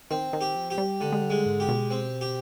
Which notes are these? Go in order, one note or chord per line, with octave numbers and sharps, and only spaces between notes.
D#3 C4
D#3
G4
F3
G4
G3
D3 G#3
G#3
G3
G#3
G#2
G4
B2
C4
G4